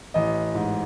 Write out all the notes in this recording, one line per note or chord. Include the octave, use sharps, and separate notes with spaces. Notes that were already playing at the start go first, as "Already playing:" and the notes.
A1 D#5
G#2